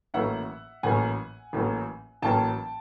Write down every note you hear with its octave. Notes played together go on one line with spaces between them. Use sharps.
A1 A2 F#3 A#3 C#4 E5 F#5
A1 A2 F#3 A#3 C#4 F#5 G#5
A1 A2 F#3 A#3 C#4
A1 A2 F#3 A#3 C#4 G5 A5